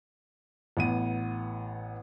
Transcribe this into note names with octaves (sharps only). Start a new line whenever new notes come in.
A1 B3 D#7